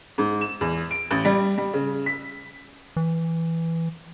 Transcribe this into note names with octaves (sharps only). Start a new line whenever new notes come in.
G#2
E7
E2
D7
A1
G3
G3
C#3
B6
E3